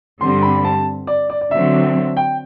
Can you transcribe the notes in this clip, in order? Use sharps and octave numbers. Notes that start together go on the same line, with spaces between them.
G2 D3 G3 C4 C6
B5
A5
D5
D5
D5
D3 F#3 C4 E5
G5